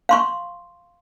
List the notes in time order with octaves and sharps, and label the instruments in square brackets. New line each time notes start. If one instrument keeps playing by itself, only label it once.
[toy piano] F5 C6 C#6